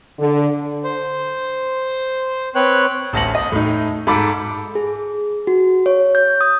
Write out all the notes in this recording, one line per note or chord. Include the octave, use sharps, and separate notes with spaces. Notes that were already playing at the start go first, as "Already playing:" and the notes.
D3
C5
C4 B4 C#5 G5 F#6
A1 D2 A5 A#6 C#7 F#7
D#5 A5
A2 D#4
G#2 A4 B5 D6
G#4
F#4
C#5
G6
D#6